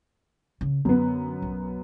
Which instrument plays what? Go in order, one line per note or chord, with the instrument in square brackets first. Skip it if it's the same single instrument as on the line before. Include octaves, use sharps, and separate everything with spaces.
[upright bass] C#3
[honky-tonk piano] F#2 B3 [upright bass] D3
[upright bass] B1